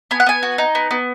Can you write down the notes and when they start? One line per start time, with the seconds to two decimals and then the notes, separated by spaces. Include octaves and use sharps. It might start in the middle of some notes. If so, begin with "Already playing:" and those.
0.11 B3 G#5
0.20 F#5
0.26 B3 G#5
0.43 F#4
0.58 D#4
0.75 B3
0.91 B3